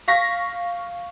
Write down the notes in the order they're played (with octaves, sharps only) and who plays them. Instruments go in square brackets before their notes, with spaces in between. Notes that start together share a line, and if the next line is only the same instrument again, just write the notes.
[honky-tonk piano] F5 C#6 A#6 B6